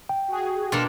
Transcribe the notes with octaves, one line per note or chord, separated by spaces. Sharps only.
G5
F#4 G#4
B2 A#3 D4 F4 A4 A#4